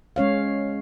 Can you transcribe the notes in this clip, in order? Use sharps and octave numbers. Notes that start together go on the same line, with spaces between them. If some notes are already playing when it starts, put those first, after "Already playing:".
G#3 C#4 C#5 F5